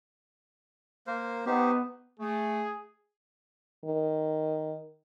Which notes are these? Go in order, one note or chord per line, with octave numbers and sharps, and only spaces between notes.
A#3 A#4 C5
B3 D#4 G4 C5
A3 G#4
D#3